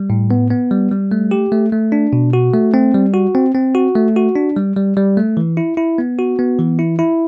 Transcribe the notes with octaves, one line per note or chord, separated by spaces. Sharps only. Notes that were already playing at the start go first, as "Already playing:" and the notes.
Already playing: G3
A2
B3
B3
G3
G3
A3
G4
A3
A3
D4
B2
F#4
A3
C4
G3
F#4
C4
C4
F#4
A3
F#4
D4
G3
G3
G3
A3
E3
E4
E4
B3
F#4
B3
E3
E4
E4